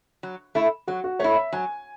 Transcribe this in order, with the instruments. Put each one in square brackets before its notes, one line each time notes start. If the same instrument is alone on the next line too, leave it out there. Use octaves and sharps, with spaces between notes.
[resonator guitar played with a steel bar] F#3
A3 E4
[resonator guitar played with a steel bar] F#3 [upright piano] F#4
[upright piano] F#4
[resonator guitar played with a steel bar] A3 E4 [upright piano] C#5
[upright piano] E5
[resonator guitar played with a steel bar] F#3 [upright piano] G#5